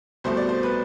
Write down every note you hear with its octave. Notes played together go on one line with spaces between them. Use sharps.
C2 B2 A3 C5
D5
C5
B4